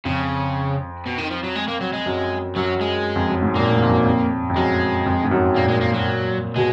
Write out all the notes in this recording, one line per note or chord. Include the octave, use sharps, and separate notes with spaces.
F2 C#3
B2
D#3
F3
F#3
G#3
A#3
F#3
G#3
F#2
F#2 F#3
G#3
F2
F#2
G#2
A#2 A#3
G#2
F2
F#2
F2
F2
F#2 G#3
F2
G#2
F#2
A#2 A#3
G#3
A#3
F#3
B2 G#3